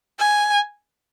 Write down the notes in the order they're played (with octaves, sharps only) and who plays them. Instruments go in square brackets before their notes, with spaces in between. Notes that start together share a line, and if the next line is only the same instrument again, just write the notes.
[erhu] G#5